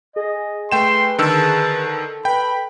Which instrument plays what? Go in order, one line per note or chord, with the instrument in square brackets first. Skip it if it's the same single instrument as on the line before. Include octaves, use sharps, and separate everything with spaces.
[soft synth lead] G#4 [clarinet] D#5
[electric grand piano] A3 G5 E7 [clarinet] B4 [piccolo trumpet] C6
[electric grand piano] D3 D#3 E6 [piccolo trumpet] A5
[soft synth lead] A4
[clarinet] B4 [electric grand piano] G5 [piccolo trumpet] B5